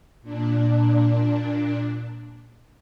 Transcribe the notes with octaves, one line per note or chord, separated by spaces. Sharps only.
A#2 D4